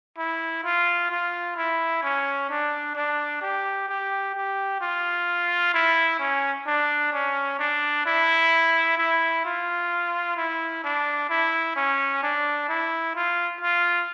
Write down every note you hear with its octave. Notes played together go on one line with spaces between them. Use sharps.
E4
F4
F4
E4
C#4
D4
D4
G4
G4
G4
F4
E4
C#4
D4
C#4
D4
E4
E4
F4
E4
D4
E4
C#4
D4
E4
F4
F4